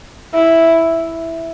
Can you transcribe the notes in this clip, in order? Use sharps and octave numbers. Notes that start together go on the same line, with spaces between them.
E4